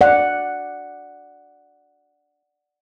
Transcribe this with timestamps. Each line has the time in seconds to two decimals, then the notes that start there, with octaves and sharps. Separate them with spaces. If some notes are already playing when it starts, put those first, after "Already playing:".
0.01 D5 F#5